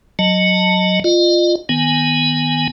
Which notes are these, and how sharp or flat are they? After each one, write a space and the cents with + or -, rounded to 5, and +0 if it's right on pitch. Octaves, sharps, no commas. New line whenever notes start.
F#3 +0 D#5 +0 A5 +20
F4 +0 D#5 -35
D#3 +0 B3 +0 G#5 +0